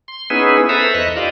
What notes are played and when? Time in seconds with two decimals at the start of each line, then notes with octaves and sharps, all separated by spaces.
0.08 C6
0.30 B3 C#4 D#4 E4 G#4 B4
0.69 A4 B4 C5 E5 A#5 B5
0.94 E2 D#5 C#6 F#6
1.16 E4 F4 G4 D5 D#5 F5